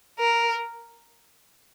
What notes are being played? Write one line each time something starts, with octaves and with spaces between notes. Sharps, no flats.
A#4